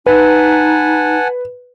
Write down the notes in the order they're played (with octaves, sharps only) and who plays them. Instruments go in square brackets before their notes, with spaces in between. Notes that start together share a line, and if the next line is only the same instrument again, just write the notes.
[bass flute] D#4 [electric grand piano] B4 [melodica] F#5 G#5 A5